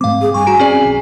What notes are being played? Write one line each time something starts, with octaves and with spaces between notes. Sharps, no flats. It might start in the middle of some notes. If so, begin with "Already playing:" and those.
G#2 A3 C4 F5 D6
G#4
G2 G#5 C#6
F#4 A#5 D7
C4 C#4 G#4 D5
B1